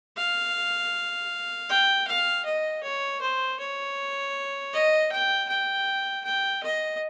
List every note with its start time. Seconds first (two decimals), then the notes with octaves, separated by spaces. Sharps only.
0.17 F5
1.69 G5
2.08 F5
2.45 D#5
2.83 C#5
3.21 C5
3.60 C#5
4.73 D#5
5.12 G5
5.49 G5
6.24 G5
6.63 D#5